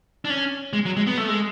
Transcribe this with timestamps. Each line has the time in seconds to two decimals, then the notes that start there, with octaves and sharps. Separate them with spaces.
0.25 D4
0.30 C#4
0.73 G#3
0.85 F#3
0.97 G#3
1.07 B3
1.17 A3
1.28 G#3